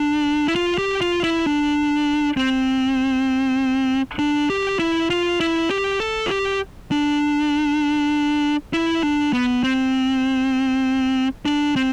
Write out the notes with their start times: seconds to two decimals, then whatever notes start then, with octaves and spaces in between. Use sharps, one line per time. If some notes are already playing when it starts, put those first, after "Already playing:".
Already playing: D4
0.48 E4
0.55 F4
0.78 G4
1.01 F4
1.24 E4
1.46 D4
2.37 C4
4.19 D4
4.50 G4
4.79 E4
5.10 F4
5.40 E4
5.70 G4
6.00 A4
6.26 F4
6.31 G4
6.91 D4
8.73 E4
9.03 D4
9.33 B3
9.63 C4
11.45 D4
11.76 C4